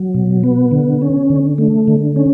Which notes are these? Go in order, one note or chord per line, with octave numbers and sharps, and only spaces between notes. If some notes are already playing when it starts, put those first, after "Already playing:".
Already playing: F#3
B2
B3
D3
C#4
D3
A3
D3
C#4